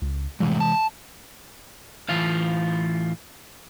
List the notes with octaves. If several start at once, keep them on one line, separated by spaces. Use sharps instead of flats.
C#2
F2 A2 C3 E3 G#3
A5
A2 E3 F4 F5